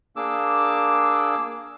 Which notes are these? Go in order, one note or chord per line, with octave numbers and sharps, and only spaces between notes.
A#3 D4 G#4 D6 E6